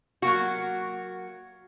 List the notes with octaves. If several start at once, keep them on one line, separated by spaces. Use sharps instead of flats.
F#3 A#3 F#4